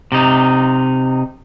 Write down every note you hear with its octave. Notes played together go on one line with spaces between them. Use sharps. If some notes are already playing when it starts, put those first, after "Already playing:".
C3 D#4